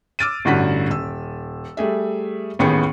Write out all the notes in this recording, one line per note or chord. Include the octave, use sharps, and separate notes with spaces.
D6 E6 F6 A6 D7 D#7
A1 G2 D3 F#4 F#5 B6
D#1 E6
G3 A3 G#4 E5
A1 D#2 B3 G#4 G5 C#7